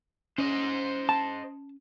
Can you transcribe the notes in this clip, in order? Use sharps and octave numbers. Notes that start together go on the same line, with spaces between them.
C#4 C5 D#5
A5